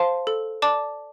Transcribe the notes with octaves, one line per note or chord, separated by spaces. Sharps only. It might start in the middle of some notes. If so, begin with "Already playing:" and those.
Already playing: C5 F5 A5 C6
A4
D5 A5 D6